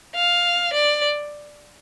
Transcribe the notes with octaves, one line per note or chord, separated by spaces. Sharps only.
F5
D5